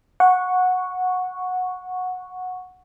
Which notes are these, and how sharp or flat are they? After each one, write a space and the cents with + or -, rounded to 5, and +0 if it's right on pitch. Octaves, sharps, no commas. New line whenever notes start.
F#5 -15 C#6 +0